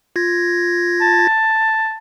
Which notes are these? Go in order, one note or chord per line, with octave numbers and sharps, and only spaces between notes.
F4 G#6 A#6
A5